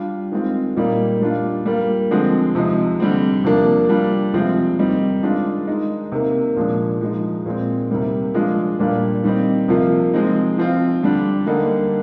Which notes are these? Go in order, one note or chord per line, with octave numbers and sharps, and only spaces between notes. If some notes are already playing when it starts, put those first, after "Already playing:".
Already playing: G3 D4 F4
D#3 G#3 C4 F4
A#2 G3 A#3 D#4
G3 D4 F4
G3 A#3 F4
D3 F3 G#3 C4
C3 F3 G#3 D#4
D3 G3 C4
C3 F3 A#3 D4
G3 D4 F4
C3 F3 G#3 C4 F4
D#3 G3 C4 D#4
D#3 G#3 D4 F4
D#3 G#3 D#4
C3 D#3 A#3
A#2 F3 G#3 D4
F3 G#3 D#4
A#2 G#3 C4
C3 D#3 G3 A#3
F3 G#3 D4 F4
A#2 G3 A#3 D4 F4
D#3 G3 C4 D#4
C3 F3 A#3 F4
F3 G#3 C4 D#4
F3 C4 F4
D3 G3 D4
D3 G3 A#3 D#4